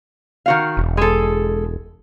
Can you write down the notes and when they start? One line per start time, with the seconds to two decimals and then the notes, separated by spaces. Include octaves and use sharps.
0.46 D#3 F#4 F5
0.77 E1
0.97 G#3 A4